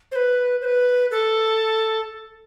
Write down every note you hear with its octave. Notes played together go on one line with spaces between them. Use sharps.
C5
B4
C5
B4
A4